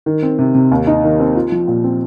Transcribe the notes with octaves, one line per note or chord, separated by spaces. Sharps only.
D#3
C4
C3
C3
D#2
D#4
D#3
C4
F4
F3
A#2
C4